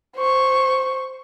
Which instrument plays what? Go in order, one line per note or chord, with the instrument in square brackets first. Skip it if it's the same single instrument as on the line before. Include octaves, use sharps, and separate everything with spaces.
[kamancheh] C5 C#6